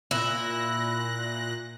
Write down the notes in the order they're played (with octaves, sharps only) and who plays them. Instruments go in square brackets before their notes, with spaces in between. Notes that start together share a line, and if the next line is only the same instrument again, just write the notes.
[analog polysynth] A#2 F#6 A#6 [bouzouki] E4